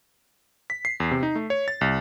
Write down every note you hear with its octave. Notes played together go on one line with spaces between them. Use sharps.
B6
C7
E2
C3
D#4
A3
C#5
A6
C2